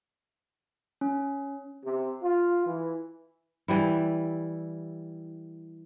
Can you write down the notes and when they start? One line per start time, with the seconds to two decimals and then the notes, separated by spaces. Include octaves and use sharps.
1.01 C#4
1.84 C3
2.23 F4
2.66 E3
3.68 E3 G3 E4